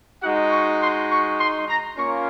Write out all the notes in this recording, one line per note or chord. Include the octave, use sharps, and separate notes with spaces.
G#3 D#4 F#4 F#5
C#6
C6
C#6
C6
A#5
A#3 C#4 F4 C#6